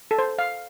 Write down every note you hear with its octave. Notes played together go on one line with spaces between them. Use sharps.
A4
C5
F5